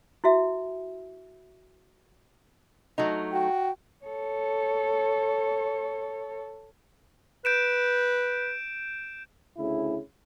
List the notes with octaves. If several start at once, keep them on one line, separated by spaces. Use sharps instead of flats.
E4 F#4 E5
F#3 A3 D#4
F#4 G5
A4 C#5
B4 G6 D7 E7
D2 C#3 E4